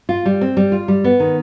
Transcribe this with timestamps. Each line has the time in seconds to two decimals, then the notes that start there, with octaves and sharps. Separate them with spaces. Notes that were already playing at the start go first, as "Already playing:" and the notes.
0.09 F4
0.26 G3
0.41 C4
0.57 G3
0.72 F4
0.88 G3
1.04 B3
1.20 D#3